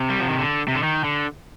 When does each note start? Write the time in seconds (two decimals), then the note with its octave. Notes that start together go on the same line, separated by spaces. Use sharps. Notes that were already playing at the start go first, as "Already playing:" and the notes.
Already playing: C3
0.10 G3
0.20 F3
0.29 D#3
0.39 D3
0.68 C3
0.75 D3
0.83 D#3
1.04 D3